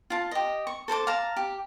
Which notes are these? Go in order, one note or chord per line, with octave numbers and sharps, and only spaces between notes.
F4 A5
G4 D#5
C#6
A4 C5 A5 D6
F5 A5 A#5
G4